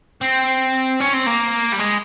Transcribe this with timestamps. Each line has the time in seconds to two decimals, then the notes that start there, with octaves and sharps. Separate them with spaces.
0.21 C4
1.00 C#4
1.14 C4
1.27 A#3
1.73 G3
1.79 G#3